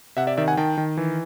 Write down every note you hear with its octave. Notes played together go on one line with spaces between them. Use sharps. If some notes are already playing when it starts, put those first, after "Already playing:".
C3 E5 F#5
D5 E5
D#3 D5 E5
F#5 G#5
D#3 G5 A5
D#3
E3